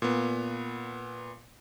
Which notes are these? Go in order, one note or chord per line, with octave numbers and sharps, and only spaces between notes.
A#2 B3